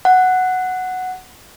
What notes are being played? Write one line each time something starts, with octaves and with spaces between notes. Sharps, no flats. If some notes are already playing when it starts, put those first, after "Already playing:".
F#5